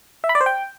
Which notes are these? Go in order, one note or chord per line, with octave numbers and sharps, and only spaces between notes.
E5
B5
D5
C5
G5